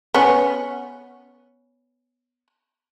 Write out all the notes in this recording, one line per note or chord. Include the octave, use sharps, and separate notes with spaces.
B3 C#4